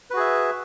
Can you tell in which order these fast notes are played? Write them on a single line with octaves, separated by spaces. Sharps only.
B4 F#4 G#4 E5